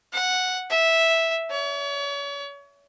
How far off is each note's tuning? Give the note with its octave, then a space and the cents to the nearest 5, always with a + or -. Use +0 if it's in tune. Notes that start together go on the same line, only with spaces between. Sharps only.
F#5 -5
E5 -5
C#5 +40